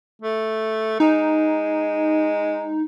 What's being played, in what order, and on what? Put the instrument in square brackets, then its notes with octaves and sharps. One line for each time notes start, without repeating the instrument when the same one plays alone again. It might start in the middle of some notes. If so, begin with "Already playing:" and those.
[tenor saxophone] A3
[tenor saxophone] G#3 [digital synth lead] D#4